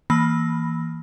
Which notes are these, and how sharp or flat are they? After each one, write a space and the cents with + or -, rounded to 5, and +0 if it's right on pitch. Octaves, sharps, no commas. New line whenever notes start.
E3 -15 A#3 +0 B5 +0